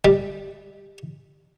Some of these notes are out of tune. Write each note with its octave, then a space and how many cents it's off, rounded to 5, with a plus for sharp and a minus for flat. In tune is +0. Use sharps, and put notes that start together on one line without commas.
G3 +5